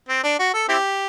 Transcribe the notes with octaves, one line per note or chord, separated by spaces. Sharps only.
C4
D4
F#4
A4
C4 E4 G4